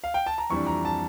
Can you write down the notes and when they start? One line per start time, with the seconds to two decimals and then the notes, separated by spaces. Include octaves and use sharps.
0.04 F5
0.14 G5
0.26 A5
0.38 A#5
0.50 F2 E3 G3 D4 C#6
0.67 A#5
0.85 A5